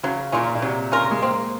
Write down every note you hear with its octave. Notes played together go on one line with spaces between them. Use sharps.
C#3 F#3
A#2 C#4 F4 A#4
A#2
C3 F#3
C#3 C#4 F4 A#4
G#3
A#3 C4